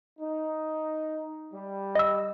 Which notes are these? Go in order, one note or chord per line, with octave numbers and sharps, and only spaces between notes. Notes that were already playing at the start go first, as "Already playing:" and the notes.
D#4
G3
D#5 E6